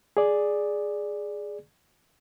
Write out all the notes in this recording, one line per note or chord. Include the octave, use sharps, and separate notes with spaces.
G#4 D5